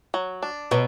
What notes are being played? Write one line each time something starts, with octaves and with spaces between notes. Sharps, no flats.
F#3
D4
B2 F#3